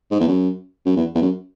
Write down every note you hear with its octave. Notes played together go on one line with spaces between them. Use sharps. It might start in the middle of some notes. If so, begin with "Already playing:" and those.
G#2
E2
F#2
F#2
E2
E2
F#2